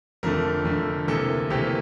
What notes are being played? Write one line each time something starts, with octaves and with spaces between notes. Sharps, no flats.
F1 F2 D3 A3 A#4
F1 F2 D3 A3
D2 C3 E3 A#3 A4
D2 C3 E3 A#3 G4